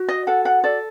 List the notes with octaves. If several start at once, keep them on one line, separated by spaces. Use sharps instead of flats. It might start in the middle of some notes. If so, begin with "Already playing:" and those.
Already playing: F#4
D#5
A4 F#5
F#5
A4 D5